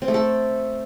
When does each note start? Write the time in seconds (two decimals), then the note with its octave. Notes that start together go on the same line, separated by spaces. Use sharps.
0.02 C4
0.08 A3
0.14 A4